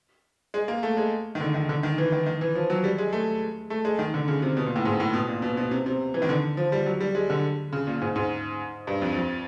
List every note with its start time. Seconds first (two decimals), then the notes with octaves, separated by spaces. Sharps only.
0.54 G#3
0.68 A#3
0.83 A3
0.97 G#3
1.35 D#3
1.40 D3
1.54 D#3
1.69 D3
1.83 D#3
1.98 E3
2.12 D#3
2.26 D#3
2.41 E3
2.55 F3
2.70 F#3
2.84 G3
2.98 G#3
3.13 A3
3.70 A3
3.85 G#3
3.99 D#3
4.14 D3
4.28 C#3
4.42 C3
4.57 B2
4.66 A#2
4.76 A2
4.85 G#2
5.00 A2
5.14 B2
5.28 A#2
5.42 B2
5.57 B2
5.71 C3
5.86 C3
6.14 E3
6.22 D#3
6.29 D3
6.57 F3
6.72 G3
6.86 F#3
7.00 G3
7.15 G#3
7.30 D3
7.72 C#3
7.87 A#2
8.01 G#2
8.16 G#2
8.87 G2
9.02 F2
9.16 F2